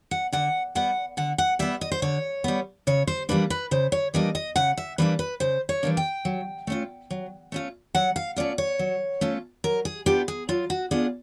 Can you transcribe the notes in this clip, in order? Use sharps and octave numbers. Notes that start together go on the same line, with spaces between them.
F#5
D3 F#5
G3 B3 F#5
D3 F#5
F#5
G3 B3 E5
D#5
C5
D3 C#5
G3 B3
C#3 C#5
C5
E3 G3 A#3 D4 B4
B4
C#3 C5
C#5
E3 G3 A#3 D4 D#5
D#5
C#3 F#5
E5
E3 G3 A#3 D4 B4
B4
C#3 C5
C#5
E3 G3 A#3 D4
G5
F#3
A3 C#4 F4
F#3
A3 C#4 F4
F#3 F#5
F5
A3 C#4 F4 D5
C#5
F#3
A3 C#4 F4
F#3 A#4
G#4
B3 D4 F4 G4
G#4
F#3 F4
F#4
B3 D4 F4 G#4